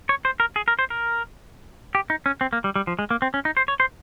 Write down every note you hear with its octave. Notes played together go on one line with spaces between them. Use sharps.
C#5
C5
A#4
G#4
A#4
C5
A#4
G4
D#4
C#4
C4
A#3
G3
G3
F3
G#3
A#3
C4
C#4
D#4
C5
C#5
C5